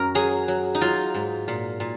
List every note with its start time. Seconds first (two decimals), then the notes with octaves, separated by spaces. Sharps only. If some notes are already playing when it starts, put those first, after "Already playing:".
Already playing: F#2 A#4
0.15 F#3 G#4
0.48 F#3
0.75 D#4
0.81 F#3 F4
1.14 G#2
1.48 A#2
1.80 A#2